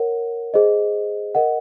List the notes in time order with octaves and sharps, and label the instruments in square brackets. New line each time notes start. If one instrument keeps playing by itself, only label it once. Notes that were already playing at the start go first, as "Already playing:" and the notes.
Already playing: [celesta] A#4 C#5 F#5
G#4 C5 D#5
A#4 D#5 F#5